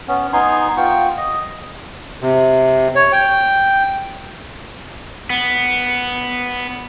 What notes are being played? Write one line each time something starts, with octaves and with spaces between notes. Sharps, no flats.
B3 C#4
B3 D#4 G#5 C6
B3 F4 G5 C#6
D#5
C3
C#5
G5
B3